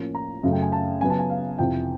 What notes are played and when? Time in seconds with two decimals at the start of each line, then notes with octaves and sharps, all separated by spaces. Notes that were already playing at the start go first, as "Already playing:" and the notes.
Already playing: A2 F3 A#3 C#4
0.15 A#5
0.43 F#2 C#3 F#3 A3
0.52 G5
0.62 G#5
0.72 A5
1.01 C#3 F#3 B3 G#5
1.10 A5
1.19 G#5
1.30 F5
1.58 F2 C3 E3 G5